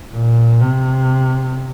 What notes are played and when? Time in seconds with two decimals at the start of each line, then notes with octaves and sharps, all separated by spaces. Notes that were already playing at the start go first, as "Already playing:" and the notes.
0.14 A#2
0.61 C3